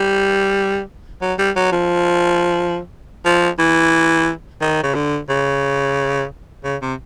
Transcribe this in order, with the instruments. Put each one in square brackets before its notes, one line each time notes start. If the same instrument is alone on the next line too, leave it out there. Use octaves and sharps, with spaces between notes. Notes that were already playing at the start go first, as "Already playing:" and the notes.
Already playing: [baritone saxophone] G3
F#3
G3
F#3
F3
F3
E3
D#3
C#3
D3
C#3
C#3
C3